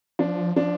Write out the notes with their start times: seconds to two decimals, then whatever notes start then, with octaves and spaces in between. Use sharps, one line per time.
0.19 F3 D4
0.56 F3 D4